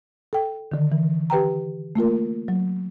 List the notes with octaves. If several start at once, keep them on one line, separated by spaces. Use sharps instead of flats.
A4 G5
D3 D#3
E3
G4 B4 G5 A#5
A3 A#3 F4 A#4
F#3